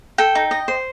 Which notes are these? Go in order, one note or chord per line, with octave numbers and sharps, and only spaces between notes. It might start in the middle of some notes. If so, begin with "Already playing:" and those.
A4 G5
D#4
D#5
C5